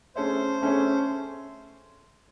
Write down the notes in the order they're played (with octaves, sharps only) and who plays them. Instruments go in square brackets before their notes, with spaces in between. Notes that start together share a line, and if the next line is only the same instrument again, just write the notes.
[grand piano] A3 C#4 G#4 C#5 E5 [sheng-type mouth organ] C5
[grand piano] A3 C#4 G#4 C#5 E5